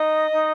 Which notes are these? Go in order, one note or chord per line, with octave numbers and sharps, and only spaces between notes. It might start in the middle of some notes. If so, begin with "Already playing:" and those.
Already playing: D#4 D#5
D#4